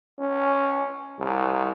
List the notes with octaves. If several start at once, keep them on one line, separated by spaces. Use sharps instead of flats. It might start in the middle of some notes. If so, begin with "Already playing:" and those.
C#4
C2